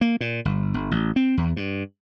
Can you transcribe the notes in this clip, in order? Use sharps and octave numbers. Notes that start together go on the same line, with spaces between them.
A#3
A#2
G1
G1
A1
C4
E2
G2